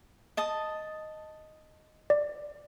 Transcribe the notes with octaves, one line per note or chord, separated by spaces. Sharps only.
D#5 A5 D#6
D5